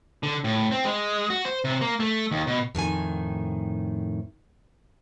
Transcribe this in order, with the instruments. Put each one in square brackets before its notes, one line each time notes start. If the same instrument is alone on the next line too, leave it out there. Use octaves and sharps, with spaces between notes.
[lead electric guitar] D3
A2
C4
G#3
F#4
C5
C3
A#3
A3
D#2
B2
[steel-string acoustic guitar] F2 A2 D#3 G#5